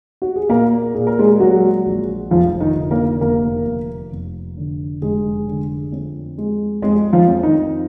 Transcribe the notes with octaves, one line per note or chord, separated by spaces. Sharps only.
F#4
G#4
A#2 A#3 A#4
A#2 G#4
A#4
G#3 G#4
F#3 G#3 F#4
A#1
F1 F3 F4
D#3 D#4
D3
A#3 A#4
F1 A#3 A#4
F1
F1
D3
F1 G#3 G#4
D3
F2
G#3
F2 G#3 G#4
F3 F4
F2
D#3 D#4